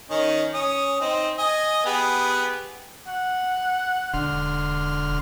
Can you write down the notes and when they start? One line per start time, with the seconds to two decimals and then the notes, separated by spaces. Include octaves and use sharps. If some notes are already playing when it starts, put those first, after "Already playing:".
0.10 D#3 C#4 D#4
0.54 C#4 D#6
1.01 C4 D#4
1.38 D#5 G#5
1.86 B3 G4 G#4
3.08 F#5
4.13 E1 D3 C6 F6